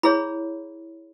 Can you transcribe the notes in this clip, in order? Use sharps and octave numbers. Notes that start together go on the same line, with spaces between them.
E4 G#4 C#5 B5